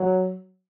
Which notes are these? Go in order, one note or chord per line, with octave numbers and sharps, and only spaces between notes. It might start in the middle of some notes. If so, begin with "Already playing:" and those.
Already playing: F#3